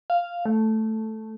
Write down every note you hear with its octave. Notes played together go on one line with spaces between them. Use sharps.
F5
A3